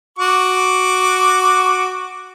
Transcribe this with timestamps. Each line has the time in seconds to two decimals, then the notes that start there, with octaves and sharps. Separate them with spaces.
0.19 F#4 D6